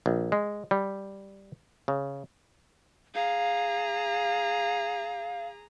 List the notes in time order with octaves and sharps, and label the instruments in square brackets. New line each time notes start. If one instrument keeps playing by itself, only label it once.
[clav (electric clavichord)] A#1
G#3
G3
C#3
[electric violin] G#4 A#5 [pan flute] F5